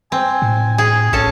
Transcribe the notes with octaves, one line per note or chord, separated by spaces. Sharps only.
C4 G#5
A2
G#4
A#1 C#4 A4 A5